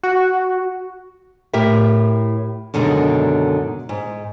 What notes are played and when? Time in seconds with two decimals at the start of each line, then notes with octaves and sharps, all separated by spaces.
0.03 F#4
1.53 A2 G4 A#4 E5
2.74 F#2 B2 D3 D#3 G#3
3.89 G#2